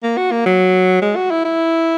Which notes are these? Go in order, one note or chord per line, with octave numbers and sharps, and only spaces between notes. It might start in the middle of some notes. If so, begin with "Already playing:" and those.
A#3
F#4
A#3
F#3
G#3
F#4
E4
E4